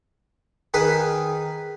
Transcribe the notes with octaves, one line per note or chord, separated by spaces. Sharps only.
D#3 G#4 B4 D#6